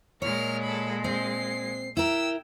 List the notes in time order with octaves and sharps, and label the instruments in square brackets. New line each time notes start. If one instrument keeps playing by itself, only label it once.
[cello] A#2 G#3 [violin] A#4 F6 [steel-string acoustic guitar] C#5
[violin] A4 B5
[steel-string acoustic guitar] C4 [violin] C7
[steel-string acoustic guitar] E4 A#4 [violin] G5 E6